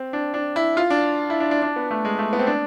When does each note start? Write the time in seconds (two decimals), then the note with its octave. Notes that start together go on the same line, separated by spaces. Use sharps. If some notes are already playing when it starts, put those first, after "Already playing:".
Already playing: C4
0.13 D4
0.34 D4
0.56 E4
0.77 F4
0.90 D4
1.30 E4
1.40 D4
1.51 D4
1.62 D4
1.76 B3
1.91 A3
2.05 G#3
2.19 A3
2.33 B3
2.39 C4
2.47 D4